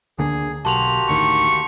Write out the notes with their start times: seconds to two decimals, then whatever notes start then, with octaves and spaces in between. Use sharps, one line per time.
0.19 D2 D3 A#3 G#4
0.65 B1 A#3 F#4 G4 A5 C6 F7
1.09 D2 A2 D#3 C#6